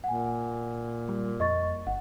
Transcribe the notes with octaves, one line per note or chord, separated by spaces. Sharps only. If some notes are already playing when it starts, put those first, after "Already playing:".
A#2 F#5 G#5
G3
F2 D#5 C#6 A6
G1 F#5